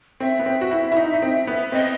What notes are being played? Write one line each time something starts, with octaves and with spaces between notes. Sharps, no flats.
C4 E5
B3
C4
F#4
E4
E4
D#4
D#4
C4
B3
C4 D#5